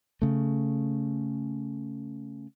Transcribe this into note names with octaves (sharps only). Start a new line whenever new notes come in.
C#3 A3